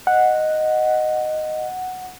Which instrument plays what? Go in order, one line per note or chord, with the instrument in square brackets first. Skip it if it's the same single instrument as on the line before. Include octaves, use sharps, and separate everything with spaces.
[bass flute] D#5 [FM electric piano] F#5